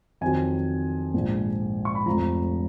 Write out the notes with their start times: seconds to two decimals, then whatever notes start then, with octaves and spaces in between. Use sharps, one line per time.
0.21 F2 D#3 F#3 G#5
1.14 A#1 G#2 F3
1.85 C#6
1.95 B5
2.06 F1 F2 F3 A#5